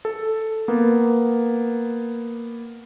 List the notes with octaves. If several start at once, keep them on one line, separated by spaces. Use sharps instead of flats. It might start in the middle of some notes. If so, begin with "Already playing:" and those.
A4
A#3 B3